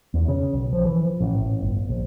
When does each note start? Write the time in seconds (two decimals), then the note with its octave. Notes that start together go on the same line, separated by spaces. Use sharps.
0.14 E2
0.28 C#3
0.53 B1
0.73 F3
0.86 E3
1.05 F3
1.21 A1
1.46 A1
1.61 G1
1.89 A#1